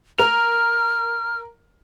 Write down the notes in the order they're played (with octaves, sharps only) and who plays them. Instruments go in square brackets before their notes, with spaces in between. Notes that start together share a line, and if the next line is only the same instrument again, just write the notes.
[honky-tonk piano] A#4 F7 [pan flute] F6